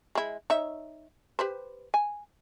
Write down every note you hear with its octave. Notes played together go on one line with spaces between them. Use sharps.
G#3 E4
D#4 C#5 E5
G4 B4 C5
G#5